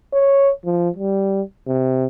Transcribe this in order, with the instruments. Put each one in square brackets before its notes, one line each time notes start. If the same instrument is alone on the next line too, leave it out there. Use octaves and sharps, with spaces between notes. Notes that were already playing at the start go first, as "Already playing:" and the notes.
[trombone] C#5
F3
G3
C3